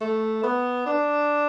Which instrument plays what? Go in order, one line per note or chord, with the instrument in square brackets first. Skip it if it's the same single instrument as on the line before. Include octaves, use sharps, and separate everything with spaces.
[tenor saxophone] A3
B3
D4